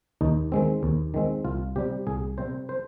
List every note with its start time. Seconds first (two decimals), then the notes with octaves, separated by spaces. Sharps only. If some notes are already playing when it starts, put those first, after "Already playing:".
0.21 D#2 D#4
0.52 D#3 G#3 C4
0.83 D#2
1.14 D#3 G#3 C4
1.45 C2 F4
1.76 C3 G3 C4 G4
2.07 C2 G#4
2.38 C3 G3 C4 C5
2.69 C5